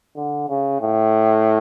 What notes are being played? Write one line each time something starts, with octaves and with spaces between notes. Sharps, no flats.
D3
C#3
A2